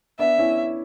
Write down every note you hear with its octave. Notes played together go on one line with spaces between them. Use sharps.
B3 D4 E5
C#4 E4